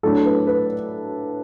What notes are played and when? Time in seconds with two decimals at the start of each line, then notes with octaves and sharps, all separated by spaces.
0.03 A2 F#3 D4 A4
0.25 B4
0.47 B4